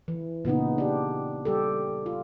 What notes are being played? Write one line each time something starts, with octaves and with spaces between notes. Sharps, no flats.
E3
A#2 C#3 B3 D#4
D4 G4
G3 G4 A4
F4